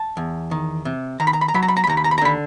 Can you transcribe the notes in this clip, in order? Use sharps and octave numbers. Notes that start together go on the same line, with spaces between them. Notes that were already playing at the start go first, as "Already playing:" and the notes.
Already playing: A5
E2
D#3
C3
D#3 A#5
B5
A#5
B5
A#5
F#3 B5
A#5
B5
A#5
B5
D#2 A#5
B5
A#5
B5
A#5
D3 B5